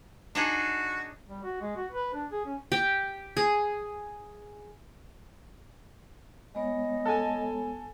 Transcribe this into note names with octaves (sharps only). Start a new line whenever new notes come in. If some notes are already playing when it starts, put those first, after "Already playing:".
D4 D#4 F#4 G#4
G3
F#4
G#3
F#4
B4
D4
G#4
C#4
G4
G#4
G#3 B3 C#5 D#5
A4 G#5